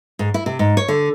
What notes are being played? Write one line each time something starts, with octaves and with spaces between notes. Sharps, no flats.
G#2
E4
C3
G#2
C#5
D3